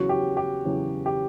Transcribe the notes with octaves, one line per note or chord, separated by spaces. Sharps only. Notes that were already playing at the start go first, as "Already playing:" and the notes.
Already playing: E2 C#3 F#3 F#4
G4
G4
E2 C#3 F#3
G4